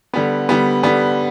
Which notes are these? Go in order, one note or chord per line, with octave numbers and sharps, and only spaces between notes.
D3 G3 B3
D3 G3 B3
D3 G3 B3